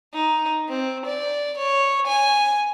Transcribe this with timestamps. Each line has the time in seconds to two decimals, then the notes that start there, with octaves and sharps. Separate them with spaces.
0.14 D#4
0.69 C4
1.06 D5
1.58 C#5
2.07 G#5